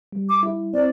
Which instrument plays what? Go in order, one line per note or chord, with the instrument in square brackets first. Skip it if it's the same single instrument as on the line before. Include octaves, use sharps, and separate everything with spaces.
[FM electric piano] G3
[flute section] D6
[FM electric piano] E4
[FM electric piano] C4 [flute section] D5